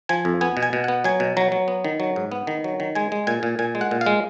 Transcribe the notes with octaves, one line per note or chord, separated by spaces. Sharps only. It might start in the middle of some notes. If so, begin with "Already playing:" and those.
F3 G#5
F2
B3 G#5
B2
G#5
B2
B3 F#5
F#3 G#5
B2
F#3 A#5
F#3
B3
D#3
F#3
G#2
B3
D#3
F#3
D#3
G#3 G#5
G#3
A#2 G#5
A#2
A#2 G#5
G#3
F#5
A#2
F5
G#3